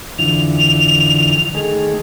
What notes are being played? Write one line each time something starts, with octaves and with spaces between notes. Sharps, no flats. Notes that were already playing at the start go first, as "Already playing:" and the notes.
F2 D3 E3 F7
D#3 A3 G#4